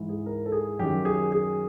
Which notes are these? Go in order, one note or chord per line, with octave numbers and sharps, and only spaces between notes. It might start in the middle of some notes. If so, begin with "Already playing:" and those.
Already playing: G#2 E3
G#4
A#4
A4
G#4
F#2 D#3 G4
G#4
G#4